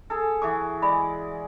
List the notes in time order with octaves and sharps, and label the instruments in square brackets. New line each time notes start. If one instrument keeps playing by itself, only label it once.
[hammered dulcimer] G#4 A4
[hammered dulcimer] E3 F#4 G#4 [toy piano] D6
[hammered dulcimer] G#3 D5 [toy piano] B5